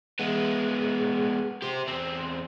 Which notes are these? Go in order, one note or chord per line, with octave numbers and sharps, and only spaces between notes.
G#3 B3
G4 C5
E2 C4